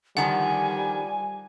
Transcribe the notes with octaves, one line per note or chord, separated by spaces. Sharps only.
D3 D#3 F3 G3 F#5 G#5